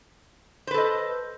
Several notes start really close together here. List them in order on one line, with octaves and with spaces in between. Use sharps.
C5 B4 A4 D#5